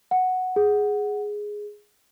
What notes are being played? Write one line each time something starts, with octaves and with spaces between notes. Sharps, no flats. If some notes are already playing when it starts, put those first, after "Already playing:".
F#5
G#4